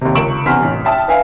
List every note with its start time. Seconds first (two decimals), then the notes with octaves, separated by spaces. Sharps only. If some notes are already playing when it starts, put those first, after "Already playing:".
0.01 D#2 C3
0.15 C#2 A#4 C#6 D7 E7 F#7
0.46 E2 C3 C#4 C6 F6 B6
0.62 A1
0.85 E5 G5 A5 D#6
1.08 B4 E5 F5 G#5